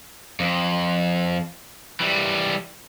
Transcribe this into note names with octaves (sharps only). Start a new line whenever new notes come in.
F2
E3 G3